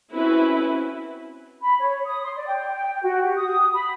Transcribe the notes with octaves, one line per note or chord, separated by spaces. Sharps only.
C4 C#4 E4 F#4 B4
B5
C#5
D#6
C6
D5
G5
G5
F#4
G4
D#6
B5